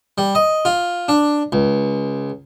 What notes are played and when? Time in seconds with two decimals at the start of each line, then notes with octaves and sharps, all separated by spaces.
0.18 G3
0.35 D#5
0.65 F4
1.08 D4
1.52 C#2